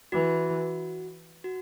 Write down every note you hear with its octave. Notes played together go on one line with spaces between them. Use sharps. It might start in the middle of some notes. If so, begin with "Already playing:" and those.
E3 F#4
F#4